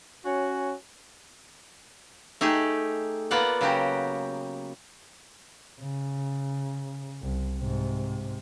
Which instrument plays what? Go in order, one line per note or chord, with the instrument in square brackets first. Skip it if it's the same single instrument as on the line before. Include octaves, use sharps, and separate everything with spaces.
[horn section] C#4 F#4 C#5 G#5
[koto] A3 D#4 G4 G#4
A#3 B3 F4 D5 F#5
C#3 F#3 F#4 G4
[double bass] C#3
C2
G#2 C3